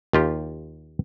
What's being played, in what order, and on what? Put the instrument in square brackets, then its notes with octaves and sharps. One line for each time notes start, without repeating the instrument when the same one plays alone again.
[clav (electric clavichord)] D#2 F4 G4